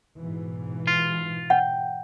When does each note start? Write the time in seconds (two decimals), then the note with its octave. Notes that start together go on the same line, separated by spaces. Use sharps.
0.18 G#2 B2 E3
0.87 F4
1.50 F#5 G5